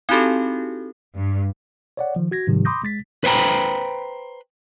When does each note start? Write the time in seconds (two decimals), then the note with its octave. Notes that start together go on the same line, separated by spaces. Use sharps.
0.09 C4 D#4 E4 F#4 G4 A4
1.16 G2
1.97 C#5 D5 F#5
2.16 D#3 F3
2.31 F#4 G#6 A#6
2.47 G#2 C3 D#3 F3 G3 G4
2.65 B5 C6 D6 D#6 G6 A#6
2.83 G#3 A6 B6
3.24 B4 C5 G5 A#5 B5